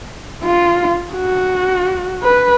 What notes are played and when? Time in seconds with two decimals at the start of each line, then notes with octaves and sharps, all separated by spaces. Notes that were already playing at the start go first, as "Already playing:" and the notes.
0.44 F4
1.13 F#4
2.23 B4